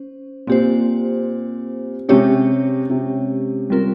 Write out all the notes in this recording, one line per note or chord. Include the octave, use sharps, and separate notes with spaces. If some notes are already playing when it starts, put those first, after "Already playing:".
Already playing: C#4 C5
A#2 C4 G4 C5
C3 G#3 C#4 G4 C#5
C3
G3 C4 F4 A#4